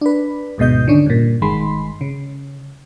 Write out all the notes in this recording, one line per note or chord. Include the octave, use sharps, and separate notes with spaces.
D4 B4
D2 G#2 B2 D#5 G6
D3 D#3 C#4 D4
G2 A#2
G1 D#3 G#3 B5 C6
C#3